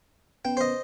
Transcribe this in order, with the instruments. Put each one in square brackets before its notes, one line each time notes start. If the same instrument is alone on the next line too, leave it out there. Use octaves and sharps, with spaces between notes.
[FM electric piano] B3 C#4 B4 [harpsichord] G5
[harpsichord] C5 D#5